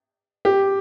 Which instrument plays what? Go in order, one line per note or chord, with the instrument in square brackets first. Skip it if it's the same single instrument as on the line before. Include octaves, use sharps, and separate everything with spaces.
[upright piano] G4